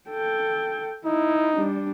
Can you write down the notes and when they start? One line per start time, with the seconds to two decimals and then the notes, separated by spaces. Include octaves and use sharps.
0.10 A4 G5
1.05 D#4 E4
1.56 G3 D4